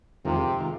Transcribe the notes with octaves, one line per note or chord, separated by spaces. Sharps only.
F2 C3 D#3 G#3 F4 A#4
D#3 G#3 F4 A#4